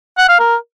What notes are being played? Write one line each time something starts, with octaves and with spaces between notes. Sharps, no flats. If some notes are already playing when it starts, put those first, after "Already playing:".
F#5
F5
A#4